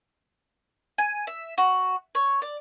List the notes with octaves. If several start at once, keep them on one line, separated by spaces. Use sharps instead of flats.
G#5
E5
F#4
C#5
D5